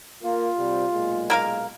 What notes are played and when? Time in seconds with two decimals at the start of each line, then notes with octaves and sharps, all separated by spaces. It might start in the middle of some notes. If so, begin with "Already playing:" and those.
0.23 A#3 F4
0.58 C3 G3
0.94 B1 A#2 G#3
1.30 A#3 A#4 F5